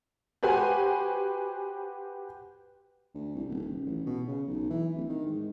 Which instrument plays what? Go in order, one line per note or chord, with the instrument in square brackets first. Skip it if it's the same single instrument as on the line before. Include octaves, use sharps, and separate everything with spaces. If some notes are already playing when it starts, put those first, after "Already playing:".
[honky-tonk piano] F#4 G4 B4 C5 G#5
[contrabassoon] D2
C2
D#1
F#1
A1
B2
C#3
B1
E3
D1
D#3
G#2